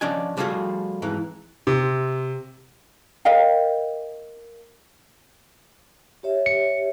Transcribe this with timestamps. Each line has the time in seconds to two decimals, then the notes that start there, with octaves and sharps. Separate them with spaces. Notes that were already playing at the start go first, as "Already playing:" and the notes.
0.01 F3 C#4 D4 D5 D#5 G#5
0.37 F3 G3 A3 F4 F#4 G#4
1.02 F2 G#2 E3
1.67 C3
3.25 A#4 D#5 F5 G5
6.23 G4 C#5 E5
6.46 C#7